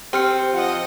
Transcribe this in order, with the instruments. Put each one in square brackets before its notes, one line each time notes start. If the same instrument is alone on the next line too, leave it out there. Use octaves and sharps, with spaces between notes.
[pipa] C4 [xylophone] G4 F6 C#7 [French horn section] C5
[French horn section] F3 F4 [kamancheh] D#5 F#5